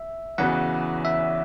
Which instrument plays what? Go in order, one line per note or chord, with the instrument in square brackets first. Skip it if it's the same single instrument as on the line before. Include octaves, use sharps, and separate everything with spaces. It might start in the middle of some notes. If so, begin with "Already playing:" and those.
Already playing: [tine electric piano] E5
[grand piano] E2 C#3 E3 B3 F#4 [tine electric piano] F#5
[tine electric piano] E5